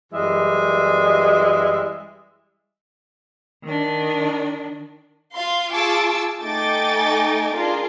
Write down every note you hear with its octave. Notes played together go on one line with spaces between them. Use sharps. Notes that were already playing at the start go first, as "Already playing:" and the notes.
F#2 E3 G3 G#3 E5
D#3 D4
F4 F5 C6
F4 G#4 A5 C#6 D6 E6
A3 D#4 G5 G#5 D6 A6
D4 F4 G#4 A#4